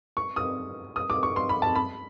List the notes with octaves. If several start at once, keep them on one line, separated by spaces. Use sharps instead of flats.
C#6
D#6
D#6
D6
C#6
C6
B5
A5
B5